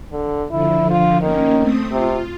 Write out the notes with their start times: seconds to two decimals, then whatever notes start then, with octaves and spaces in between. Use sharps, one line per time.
0.12 D3
0.51 D3 F3 E4
0.90 F4
1.21 D#3 A#3 C#4
1.58 A3 C4 D#6
1.91 C3 F4